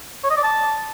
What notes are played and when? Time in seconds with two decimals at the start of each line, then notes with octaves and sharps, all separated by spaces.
0.24 C#5
0.30 D#5
0.37 D5
0.43 A5